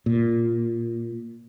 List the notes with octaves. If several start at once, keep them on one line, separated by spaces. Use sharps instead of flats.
A#2